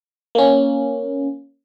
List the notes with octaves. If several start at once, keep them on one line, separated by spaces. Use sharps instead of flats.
A#3 C#4